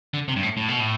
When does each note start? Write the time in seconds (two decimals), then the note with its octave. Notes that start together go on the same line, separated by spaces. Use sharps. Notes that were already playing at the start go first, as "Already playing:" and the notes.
0.14 D3
0.28 C3
0.36 G2
0.43 A2
0.57 A2
0.68 B2
0.80 A2